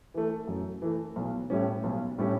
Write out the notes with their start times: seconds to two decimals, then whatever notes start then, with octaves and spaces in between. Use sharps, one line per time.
0.14 E3 A3
0.48 F#2
0.82 E3 A3
1.16 B1
1.50 A2 G3 C#4
1.84 B1
2.18 A2 G3 C#4